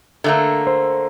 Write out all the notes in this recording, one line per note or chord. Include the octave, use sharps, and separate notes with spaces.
D3 A3 A#3
C5